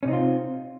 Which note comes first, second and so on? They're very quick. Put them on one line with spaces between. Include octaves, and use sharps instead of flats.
C#4 C3 D#4 C4 F4